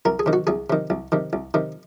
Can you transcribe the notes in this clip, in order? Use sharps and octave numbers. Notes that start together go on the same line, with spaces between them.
C2 A#4
G#4
C3 D#3
F#4
C2 G#4
C3 D#3
C2
C3 D#3
C2
C3 D#3